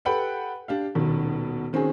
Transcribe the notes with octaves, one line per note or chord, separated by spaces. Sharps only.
G4 A4 B4 F#5 G5 B5
D4 G4 F5
D#1 B2 D#3
D#3 C4 C#4 F#4 G#4